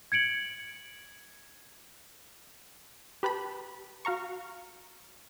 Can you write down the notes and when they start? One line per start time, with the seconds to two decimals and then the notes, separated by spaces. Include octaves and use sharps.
0.12 G#6 C#7 D7 F#7
3.23 G4 B4 A5 B5
4.05 F#4 F5 A#5 C#6